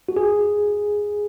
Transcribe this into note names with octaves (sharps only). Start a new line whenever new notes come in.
F#4
G#4